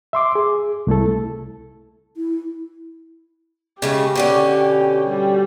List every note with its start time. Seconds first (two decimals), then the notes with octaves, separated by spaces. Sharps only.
0.13 E5 C6 D6
0.35 G#4
0.87 C2 A3 E4 A4
2.17 E4
3.82 C#3 G#3 A3 G4
4.15 B2 D3 C#4
5.08 G3